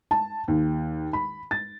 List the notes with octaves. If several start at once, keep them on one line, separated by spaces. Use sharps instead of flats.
A5
D#2
B5
A6